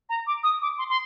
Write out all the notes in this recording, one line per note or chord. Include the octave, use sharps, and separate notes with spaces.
A#5
D6
D#6
D6
C6
C6